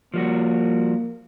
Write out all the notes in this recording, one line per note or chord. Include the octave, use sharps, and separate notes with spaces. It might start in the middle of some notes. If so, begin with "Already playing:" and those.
F3 G3 A#3 F#4